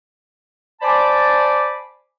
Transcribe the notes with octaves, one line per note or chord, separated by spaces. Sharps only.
C5 D5 G#5 A5 B5 D6